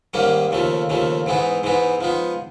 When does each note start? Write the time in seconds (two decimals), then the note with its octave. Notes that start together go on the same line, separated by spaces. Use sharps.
0.14 G#2 D#3 G3 A#3 C#4
0.51 D#2 C#3 F3 A3
0.89 D#2 C#3 F3 A3
1.26 G#2 E3 G#3 B3 D#4
1.63 G#2 E3 G#3 B3 D#4
2.01 F3 G#3 B3 D#4